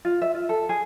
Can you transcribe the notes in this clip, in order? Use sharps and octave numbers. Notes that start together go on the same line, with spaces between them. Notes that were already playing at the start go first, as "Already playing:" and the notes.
F4
E5
F4
A4
G#4